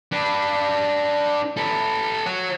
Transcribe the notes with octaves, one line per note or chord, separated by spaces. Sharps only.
D4 B4
A4 B4
C#5 F#5